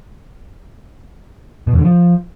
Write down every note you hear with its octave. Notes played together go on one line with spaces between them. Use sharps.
B2
E2
D3
F3